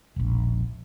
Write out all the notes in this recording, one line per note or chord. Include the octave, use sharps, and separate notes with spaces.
E1 A#1